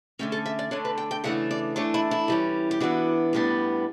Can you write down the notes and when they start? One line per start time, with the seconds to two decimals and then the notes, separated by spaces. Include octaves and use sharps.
0.19 D3 A3 C#4 G5
0.32 A4
0.46 E5
0.59 D5
0.71 D3 A3 D4 C#5
0.85 B4
0.98 G5
1.11 G5
1.24 C#3 E3 A3 D4 F#5
1.51 D5
1.76 E3 A3 D4 C#5
1.94 E4
2.11 E4
2.28 E3 G3 C#4
2.71 G4
2.80 E3 B3 D4 F#4
3.33 A2 G3 B3 D4